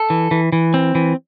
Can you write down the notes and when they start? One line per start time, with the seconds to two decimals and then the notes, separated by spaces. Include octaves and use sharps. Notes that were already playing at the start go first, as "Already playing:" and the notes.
Already playing: A4
0.10 E3
0.31 E3
0.52 E3
0.74 C4
0.95 E3